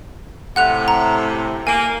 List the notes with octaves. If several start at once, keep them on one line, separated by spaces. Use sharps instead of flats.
A2 C3 F#5 F#6 F7
A#5
A#3 G#5